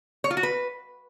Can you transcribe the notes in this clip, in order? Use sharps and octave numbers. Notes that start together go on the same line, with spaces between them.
C#5
F4
F#4
B4